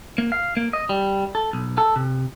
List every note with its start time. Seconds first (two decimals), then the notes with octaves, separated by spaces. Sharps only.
0.18 A#3
0.32 F5
0.57 A#3
0.73 D#5
0.89 G3
1.35 A4
1.53 B1
1.78 A4
1.96 C3